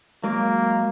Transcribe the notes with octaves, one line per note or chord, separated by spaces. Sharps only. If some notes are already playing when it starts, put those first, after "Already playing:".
F#3 G#3 A#3 A#4